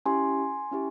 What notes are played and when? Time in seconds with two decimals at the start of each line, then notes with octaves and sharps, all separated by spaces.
0.06 C#4 E4 G4 G#5 C6
0.71 C#4 E4 G4